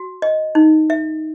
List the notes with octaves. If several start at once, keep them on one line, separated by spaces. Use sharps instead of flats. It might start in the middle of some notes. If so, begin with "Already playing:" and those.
Already playing: F#4
D#5
D#4
E5